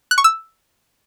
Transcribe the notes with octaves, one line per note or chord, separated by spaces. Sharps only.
F#6
C#6
E6